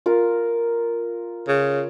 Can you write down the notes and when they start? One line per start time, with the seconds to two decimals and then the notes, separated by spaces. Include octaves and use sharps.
0.06 F4 A#4
1.48 C#3